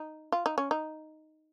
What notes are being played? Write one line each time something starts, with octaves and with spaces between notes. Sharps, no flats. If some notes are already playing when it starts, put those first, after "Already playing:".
Already playing: D#4
F4
D#4
C#4
D#4